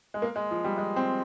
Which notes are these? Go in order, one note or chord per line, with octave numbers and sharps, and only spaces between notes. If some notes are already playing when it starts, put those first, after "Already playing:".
G#3
A#3
G#3
F3
G3
G#3
C4